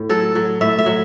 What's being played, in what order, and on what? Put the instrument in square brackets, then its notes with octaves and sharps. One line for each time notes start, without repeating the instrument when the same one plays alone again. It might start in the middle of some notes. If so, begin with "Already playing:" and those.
Already playing: [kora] A2
F#3 A4
F#3
A2 E5
E5
F#3